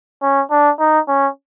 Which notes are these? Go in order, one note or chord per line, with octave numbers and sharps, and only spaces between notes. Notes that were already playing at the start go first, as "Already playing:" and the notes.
C#4
D4
D#4
C#4